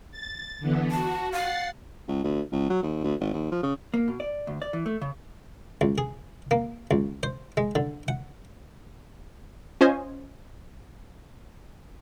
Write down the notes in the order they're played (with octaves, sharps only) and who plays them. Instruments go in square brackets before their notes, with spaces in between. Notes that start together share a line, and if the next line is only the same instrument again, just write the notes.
[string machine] A6
D3 E3 B3
[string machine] F#4 [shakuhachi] A5
[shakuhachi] F5 [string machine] F#5 A6 C7
[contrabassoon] C#2
D2
C#2
F#3
D#2
D2
G#1
D#2
F3
C#3
[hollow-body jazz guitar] A#3
B2
D5
D2
D5
E3
A3
C#3
[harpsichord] C#2
G#4
A#3
C#2
C5
G#3
D3
F#5
[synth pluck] C#4 F4 C5 D#5 G#5